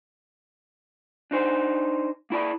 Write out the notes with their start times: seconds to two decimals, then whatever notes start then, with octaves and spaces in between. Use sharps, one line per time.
1.31 D4 D#4 C5
2.30 A#3 E4 D5 B5